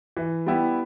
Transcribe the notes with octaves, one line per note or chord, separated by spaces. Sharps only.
E3
G3 B3 E4 G4